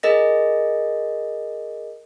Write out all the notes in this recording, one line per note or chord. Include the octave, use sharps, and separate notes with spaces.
G#4 A#4 D#5 A#6